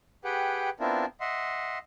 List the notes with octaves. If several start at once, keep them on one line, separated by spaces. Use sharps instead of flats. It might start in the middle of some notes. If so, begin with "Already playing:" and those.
G4 G#4 B4 F#5 G5
B3 C4 D4 E4 F4 A#4
D#5 E5 F#5 C6